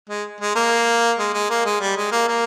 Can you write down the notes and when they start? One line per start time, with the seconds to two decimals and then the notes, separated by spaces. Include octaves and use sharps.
0.09 G#3
0.40 G#3
0.55 A#3
1.18 G#3
1.34 G#3
1.50 A#3
1.66 G#3
1.80 G3
1.97 G#3
2.12 A#3
2.28 A#3